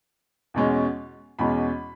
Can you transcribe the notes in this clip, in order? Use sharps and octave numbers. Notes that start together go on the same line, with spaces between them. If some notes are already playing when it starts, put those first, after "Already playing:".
E2 B2 G#3 C#4
E2 B2 G#3 C#4 B5